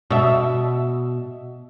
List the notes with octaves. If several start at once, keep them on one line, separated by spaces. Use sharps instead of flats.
B2 E5